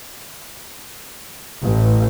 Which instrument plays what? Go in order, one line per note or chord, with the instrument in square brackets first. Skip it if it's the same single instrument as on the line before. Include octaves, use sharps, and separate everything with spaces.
[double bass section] A1